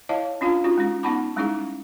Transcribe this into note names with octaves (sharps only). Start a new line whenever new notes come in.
E4 C#5 D#5 F5 A5
C#4 D4 F4 F5 A5
C#4 D#4 F4 F#4
G#3 C#4
B3 D#4 F#5 A5 B5 D6
G3 G#3 C#4 D#4 E4 G#4